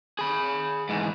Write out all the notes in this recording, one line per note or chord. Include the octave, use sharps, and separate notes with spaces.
G#4 B5
G#2 E3